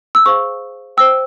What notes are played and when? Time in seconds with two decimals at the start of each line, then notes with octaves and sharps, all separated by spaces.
0.15 E6
0.26 G#4 C5 F5 C#6
0.97 C5 G5 E6